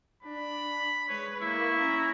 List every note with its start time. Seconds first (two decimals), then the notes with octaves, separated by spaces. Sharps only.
0.23 D4 B5
1.09 G#3 B4 C#5
1.41 A#3 E4 C#6
1.79 C#4 A#5